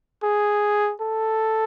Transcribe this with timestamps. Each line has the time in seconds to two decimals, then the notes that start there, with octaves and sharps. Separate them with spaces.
0.23 G#4
1.01 A4